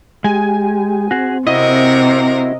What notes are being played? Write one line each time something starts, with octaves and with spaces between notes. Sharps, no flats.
G#3 G4 G#5
C4 F#4 G#4
C3 E4 F#4 A#4 D#5